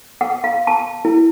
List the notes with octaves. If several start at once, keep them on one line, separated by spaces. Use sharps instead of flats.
F#5
F5
A5
E4